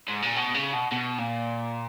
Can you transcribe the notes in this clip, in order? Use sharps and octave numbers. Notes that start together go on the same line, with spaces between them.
G#2
A#2
B2
C#3
B2
B2
A#2